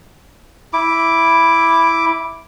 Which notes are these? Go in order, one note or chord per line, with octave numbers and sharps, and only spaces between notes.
E4 D6